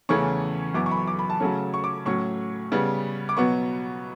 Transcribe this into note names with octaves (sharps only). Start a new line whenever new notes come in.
E2 C#3 E3 A3 C#4 C#6
F#2 E3 B3 D6
C#6
B5
C#6
D6
B5
A5
C#3 F#3 A3 C#4
C#6
D6
A2 F#3 C#4 C#6
C#3 G3 B3
D6
B2 F#3 B3 C#6